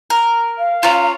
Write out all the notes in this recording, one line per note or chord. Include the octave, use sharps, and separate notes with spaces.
A#4
F5
C#4 F4 A#5